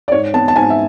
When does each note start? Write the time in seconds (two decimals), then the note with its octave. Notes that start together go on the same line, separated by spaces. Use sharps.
0.08 D5
0.12 G#2 C#5
0.34 B3 A5
0.48 A5
0.56 G#2 G#5
0.70 E5